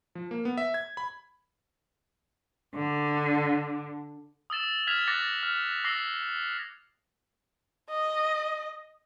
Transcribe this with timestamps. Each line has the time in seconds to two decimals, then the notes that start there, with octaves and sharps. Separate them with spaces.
0.15 F3
0.31 A#3
0.45 B3
0.57 E5
0.74 G#6
0.97 B5
2.74 D3
4.50 D#6 E6 A6 E7
4.87 F6 G#6 B6 E7 F7
5.07 D6 F#6 A6 A#6 C#7
5.43 F6
5.84 D6 E6 A#6 C7 F#7
7.90 D#5